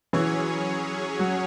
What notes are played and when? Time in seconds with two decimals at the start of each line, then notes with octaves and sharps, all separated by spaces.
0.13 E3 F#3 C#4 G#4 C#5
1.19 F#3